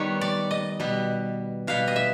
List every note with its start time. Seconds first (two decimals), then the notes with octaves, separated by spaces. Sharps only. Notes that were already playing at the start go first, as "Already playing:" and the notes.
Already playing: D#3 G3 B3 C#5
0.21 D5
0.51 D#5
0.80 B2 G3 B3
1.67 B2 G3 B3 F5
1.88 D#5
1.96 E5